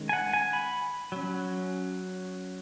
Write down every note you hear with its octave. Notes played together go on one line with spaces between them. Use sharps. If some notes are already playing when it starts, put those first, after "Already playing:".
Already playing: D#3 G#3 C#4
G#5
F#5
G#5
B5
F#3 C#4